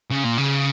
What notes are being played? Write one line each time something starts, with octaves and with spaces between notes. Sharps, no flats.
C#3
A#2
C#3